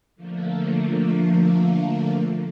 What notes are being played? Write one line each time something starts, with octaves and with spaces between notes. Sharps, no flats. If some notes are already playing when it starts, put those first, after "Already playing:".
D3 F3 A3 A#3